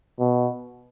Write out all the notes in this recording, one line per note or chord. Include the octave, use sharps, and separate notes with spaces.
B2